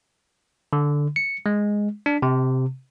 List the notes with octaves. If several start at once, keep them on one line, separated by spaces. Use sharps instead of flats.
D3
C#7
G#3
D4
C3